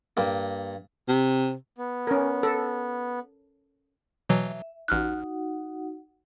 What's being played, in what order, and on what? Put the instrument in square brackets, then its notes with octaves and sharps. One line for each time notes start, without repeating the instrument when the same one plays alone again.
[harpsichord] G2 A#3
[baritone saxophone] C3
[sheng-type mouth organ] B3
[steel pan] C#4 A#4
A4
[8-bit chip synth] B2 E3 F#3 [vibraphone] E5
[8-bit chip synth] A1 F6 F#6 [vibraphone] D#4 F#4 F#5